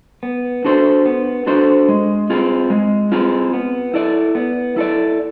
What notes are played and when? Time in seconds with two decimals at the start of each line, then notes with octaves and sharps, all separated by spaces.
0.23 B3
0.65 D4 F#4 A4 C5
1.06 B3
1.47 D4 F#4 A4 C5
1.89 G#3
2.30 C4 F4 G#4
2.70 G#3
3.12 C4 F4 G#4
3.53 B3
3.94 E4 A4 D5
4.35 B3
4.77 E4 A4 D5